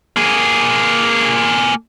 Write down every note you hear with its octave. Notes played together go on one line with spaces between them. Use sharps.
A#3 G#4